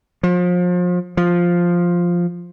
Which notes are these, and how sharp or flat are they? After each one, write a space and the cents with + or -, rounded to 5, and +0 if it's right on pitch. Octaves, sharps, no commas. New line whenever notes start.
F3 +35
F3 +0